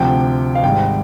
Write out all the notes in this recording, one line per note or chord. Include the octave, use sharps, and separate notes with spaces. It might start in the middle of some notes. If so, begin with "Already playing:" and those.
Already playing: D2 C3 F3 G5
F5
G#1 G#2 G3 G5